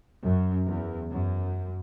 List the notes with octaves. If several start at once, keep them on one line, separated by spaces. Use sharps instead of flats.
F#2
E2
F#2